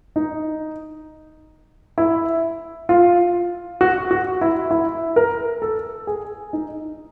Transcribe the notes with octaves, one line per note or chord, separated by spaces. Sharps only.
D#4
E4
F4
F#4
F#4
E4
E4
A#4
A4
G#4
D#4